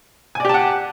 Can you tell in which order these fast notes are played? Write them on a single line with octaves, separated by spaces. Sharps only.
G#5 D5 G4 A5 F#5